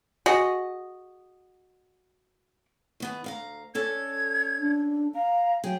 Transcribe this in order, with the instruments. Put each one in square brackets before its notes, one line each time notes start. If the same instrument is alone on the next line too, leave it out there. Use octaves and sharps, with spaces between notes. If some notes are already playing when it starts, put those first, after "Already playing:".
[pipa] F#4 G#4 D#5
[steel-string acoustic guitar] D#3 B3 G#4
D2 F5 A#5
[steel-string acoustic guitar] C#4 A4 D5 [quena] G#6
[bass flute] D4
[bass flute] F5 [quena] A#5
[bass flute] F#3 [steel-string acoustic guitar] G#4 [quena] G5